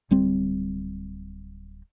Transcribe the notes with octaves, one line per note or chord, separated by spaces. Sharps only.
D1 G3 C4